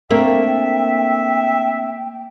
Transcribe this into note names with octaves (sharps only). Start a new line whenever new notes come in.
A3 A#3 C4 D4 E5 G5